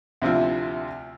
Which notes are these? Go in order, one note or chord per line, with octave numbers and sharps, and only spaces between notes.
D2 C3 F3 E4 F4